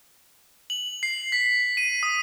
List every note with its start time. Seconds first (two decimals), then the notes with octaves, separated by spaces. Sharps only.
0.70 F#7
1.03 C7
1.32 B6
1.77 D#7
2.03 D#6